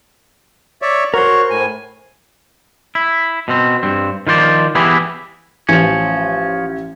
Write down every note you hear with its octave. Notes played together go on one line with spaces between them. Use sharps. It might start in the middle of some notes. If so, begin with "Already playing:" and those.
C#5 D5 E5
F#4 A#4 C5 C#5
A2 G#5
E4
B2 C4
G2 C4
D#3 F3 C5 D5
E3 B3 E4 G4 G#4
A1 F3 C#4